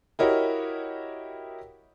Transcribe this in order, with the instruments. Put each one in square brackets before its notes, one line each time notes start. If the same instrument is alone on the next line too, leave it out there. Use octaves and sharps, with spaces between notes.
[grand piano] E4 F#4 G4 A#4 C#5 D#5